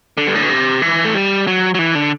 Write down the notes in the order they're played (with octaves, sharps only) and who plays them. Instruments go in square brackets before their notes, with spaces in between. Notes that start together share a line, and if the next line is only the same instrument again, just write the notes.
[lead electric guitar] D3
G2
A2
B2
C3
E3
A3
G3
F#3
F#3
E3
D3